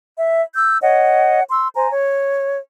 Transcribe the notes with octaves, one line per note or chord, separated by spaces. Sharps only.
E5
E6 G6
C#5 D#5 F#5
C6 E6
C5 G#5 A#5
C#5